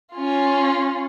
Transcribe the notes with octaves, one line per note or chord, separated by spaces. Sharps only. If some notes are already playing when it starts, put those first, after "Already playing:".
C#4 F4